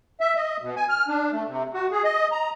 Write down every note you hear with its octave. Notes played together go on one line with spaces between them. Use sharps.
E5
D#5
B2
G#5
F6
D4
A3
C3
F#4
G#4
D#5
A#5